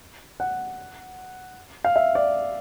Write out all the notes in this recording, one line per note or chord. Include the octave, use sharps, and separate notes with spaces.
F#5
F5
E5
D5